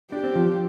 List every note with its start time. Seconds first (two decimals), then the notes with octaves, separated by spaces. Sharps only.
0.12 D4 G4
0.24 C4
0.36 F3